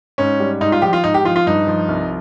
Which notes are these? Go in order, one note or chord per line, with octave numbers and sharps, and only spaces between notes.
G#2 C#4
G3
G#2 D#4
F4
F3 G4
F4
G#2 D#4
G4
F3 F4
F4
G2 D#4
F3
C2